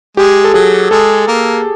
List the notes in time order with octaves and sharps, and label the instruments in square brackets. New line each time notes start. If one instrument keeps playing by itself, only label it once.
[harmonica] G#3 [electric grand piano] G4
[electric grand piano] A4
[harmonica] F#3 [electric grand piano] G#4
[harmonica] G#3 [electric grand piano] A4
[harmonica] A#3